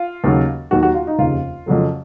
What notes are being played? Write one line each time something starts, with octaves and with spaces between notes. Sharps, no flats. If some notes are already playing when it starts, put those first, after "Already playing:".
Already playing: F4
D#2 C#3 F#3
D#2 D#3 F#3 F#4
F#4
F4
D#4
F1 D#2 C#3 F4
F2 C#3 F#3 A3